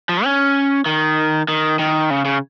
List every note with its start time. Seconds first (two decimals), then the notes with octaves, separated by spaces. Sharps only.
0.09 F3
0.24 C#4
0.86 D#3
1.48 D#3
1.79 D#3
2.10 C#3
2.25 C#3